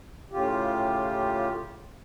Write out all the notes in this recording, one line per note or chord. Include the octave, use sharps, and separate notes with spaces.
A2 C#3 F4 G4